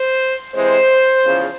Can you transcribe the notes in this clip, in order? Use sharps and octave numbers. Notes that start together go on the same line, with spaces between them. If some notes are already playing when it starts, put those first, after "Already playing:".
Already playing: C5
C3 E3 G#3 C4 C5
E2 C#3 F3